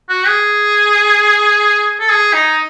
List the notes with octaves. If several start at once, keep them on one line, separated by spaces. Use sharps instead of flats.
F#4
G#4
A4
G#4
D#4